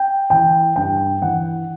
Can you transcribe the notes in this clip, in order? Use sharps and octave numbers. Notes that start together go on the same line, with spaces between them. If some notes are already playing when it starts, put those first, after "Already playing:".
Already playing: G5
E3 G5
G2 G5
E3 F#5